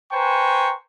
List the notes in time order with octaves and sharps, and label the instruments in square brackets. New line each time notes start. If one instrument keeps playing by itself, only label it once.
[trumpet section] B4 C5 G5 G#5 A#5 C#6